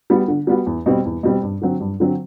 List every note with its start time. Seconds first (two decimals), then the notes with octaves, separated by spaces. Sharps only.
0.10 G3 B3 F#4
0.28 D3
0.47 G3 B3 F#4
0.66 E2
0.86 B2 G3 C4
1.05 E2
1.23 B2 G3 C4
1.42 G2
1.62 D3 F#3 C4
1.80 G2
2.00 D3 F#3 C4